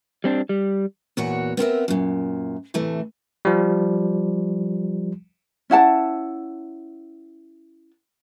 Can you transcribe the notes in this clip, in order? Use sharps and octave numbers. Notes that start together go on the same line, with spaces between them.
G3 C4 D4
G3
E2 A#2 F#4 C#5 F#5
B3 C4 A#4 E5
F#2 A#2
A2 C3 E3 A3
F3 G3
C#4 E4 F#5 A5